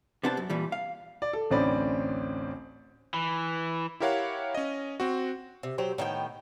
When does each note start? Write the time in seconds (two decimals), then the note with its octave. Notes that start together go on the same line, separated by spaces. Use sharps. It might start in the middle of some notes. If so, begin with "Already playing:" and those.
0.23 C3 B3 D4 C5 A5
0.37 F#2
0.50 A#2 E3 G3
0.72 F5
1.22 D5
1.33 A4
1.50 A1 D2 C4 C#4 D5 B5
3.14 E3
4.00 E4 G4 A#4 C#5 F5 F#5
4.55 C#4 D#5
5.00 C4 F#4
5.63 C3
5.78 F#3 G4 C5
5.98 A2 D#3 B3 G5